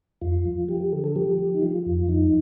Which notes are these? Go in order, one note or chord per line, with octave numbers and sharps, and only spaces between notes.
F2 F4
F3
F3 G4
G4
D3 A4
A4
F3 G4
F3
D#4
F3 F4
F2
F3 D#4